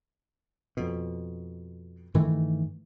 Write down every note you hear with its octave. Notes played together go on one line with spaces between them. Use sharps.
F2 B2
G2 D#3 E3 A3